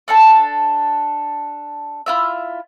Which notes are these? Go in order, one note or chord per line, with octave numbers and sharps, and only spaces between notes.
D4 A4 A5
E4 F4 E5